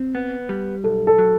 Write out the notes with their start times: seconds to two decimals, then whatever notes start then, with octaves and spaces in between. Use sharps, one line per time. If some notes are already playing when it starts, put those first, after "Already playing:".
Already playing: C4
0.15 B3
0.49 G3
0.84 B1 A4
1.07 A4
1.18 F#3